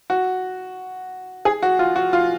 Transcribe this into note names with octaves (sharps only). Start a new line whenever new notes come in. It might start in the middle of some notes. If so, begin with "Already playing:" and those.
F#4
G#4
F#4
F4
F#4
F4